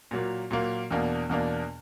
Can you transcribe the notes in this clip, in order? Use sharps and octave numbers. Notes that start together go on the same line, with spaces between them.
A#2 F#3 A#3
A#2 F#3 A#3
E2 B2 A#3 D4
E2 B2 A#3 D4